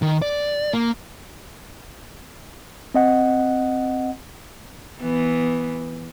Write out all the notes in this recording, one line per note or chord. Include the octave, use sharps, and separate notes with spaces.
D#3
D5
A#3
C4 D#5 F#5
E3 B3